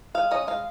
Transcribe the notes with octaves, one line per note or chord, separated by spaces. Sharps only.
G#3 F5
C#4 D#5
G#3 F5